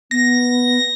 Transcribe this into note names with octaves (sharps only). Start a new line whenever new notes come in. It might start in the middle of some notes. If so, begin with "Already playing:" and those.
B3 A#6